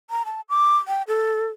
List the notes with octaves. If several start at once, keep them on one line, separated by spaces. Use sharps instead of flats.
A#5
A5
D6
G5
A4